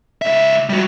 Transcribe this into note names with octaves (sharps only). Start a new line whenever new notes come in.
C#2 E5
G3 F#4